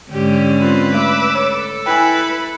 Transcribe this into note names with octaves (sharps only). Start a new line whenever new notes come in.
G#2 D3 C#4 G4
C4 F4 B4
A3 D6 E6
A4 C#5
E4 B4 G5 G#5 B5